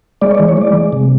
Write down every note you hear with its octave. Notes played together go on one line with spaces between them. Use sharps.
G#3 D5
C#5
D5
E3
C#5
G#3 D5
G#3
C3